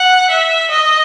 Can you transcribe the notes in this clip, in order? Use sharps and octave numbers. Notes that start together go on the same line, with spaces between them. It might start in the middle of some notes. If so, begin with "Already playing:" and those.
Already playing: F#5
E5
D#5